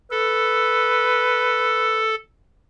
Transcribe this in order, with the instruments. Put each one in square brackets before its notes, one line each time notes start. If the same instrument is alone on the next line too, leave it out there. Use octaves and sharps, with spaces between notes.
[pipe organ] A4 [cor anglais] B4